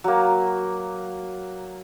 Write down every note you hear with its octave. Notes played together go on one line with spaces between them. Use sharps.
F#3 A#3